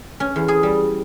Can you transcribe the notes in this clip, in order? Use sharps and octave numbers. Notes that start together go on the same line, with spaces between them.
C#4
E2
G#4
G3